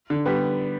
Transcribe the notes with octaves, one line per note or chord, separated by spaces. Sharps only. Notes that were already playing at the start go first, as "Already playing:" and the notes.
D3
G3 B3